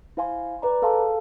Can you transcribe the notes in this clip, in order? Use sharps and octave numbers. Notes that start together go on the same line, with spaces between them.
E4 C5 F5 G#5 C6
B4 D5 A#5
G#4 A4 F5 A5 C6